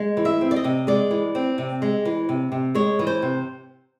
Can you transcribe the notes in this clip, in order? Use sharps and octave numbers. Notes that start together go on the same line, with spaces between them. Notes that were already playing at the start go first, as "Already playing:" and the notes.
Already playing: G#3
E3
E5
C4
D5
D#5
C3
G#3 D5
E3
C4
C3
G#3
E3
C3
C3
G#3 C#5
E3
C5
C3